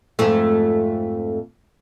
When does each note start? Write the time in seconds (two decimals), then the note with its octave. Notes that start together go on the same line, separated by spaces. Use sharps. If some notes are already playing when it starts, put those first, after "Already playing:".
0.19 F2 G#2 A3